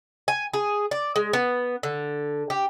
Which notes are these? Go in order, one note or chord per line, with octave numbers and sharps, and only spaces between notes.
G#5
G#4
D5
G#3
B3
D3
G4